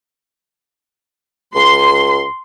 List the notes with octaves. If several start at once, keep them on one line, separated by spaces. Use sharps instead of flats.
C#2 C6